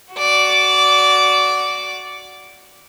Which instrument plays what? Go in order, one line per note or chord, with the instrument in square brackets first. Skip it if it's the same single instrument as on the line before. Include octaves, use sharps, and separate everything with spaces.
[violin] F#4 D5